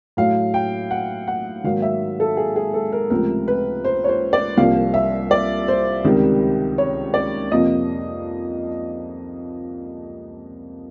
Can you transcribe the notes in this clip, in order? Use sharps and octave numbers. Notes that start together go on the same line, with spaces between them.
A2 F#3 A3 F5
G5
F#5
F#5
G#2 D#3 F#3 A#3 F5
E5
A4
G#4
G#4
A4
A#4
C#2 C3 F3 A3 A#4
B4
C5
C#5
C5
D5
C2 C3 F3 A#3 F5
E5
D5
C5
C#2 C3 D#3 G3
C#5
D5
F2 C3 F3 A#3 D#5